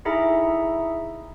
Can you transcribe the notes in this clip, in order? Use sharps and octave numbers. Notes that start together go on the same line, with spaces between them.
D#4 E4 G#4 A4 E5 A#5